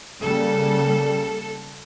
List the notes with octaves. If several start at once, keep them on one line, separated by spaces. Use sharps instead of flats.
C#3 G3 A#3 A4